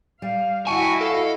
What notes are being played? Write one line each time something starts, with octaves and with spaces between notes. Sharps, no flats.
G3 F5
E4 F#4 D#5 G#5 A5 C#6
A4 F5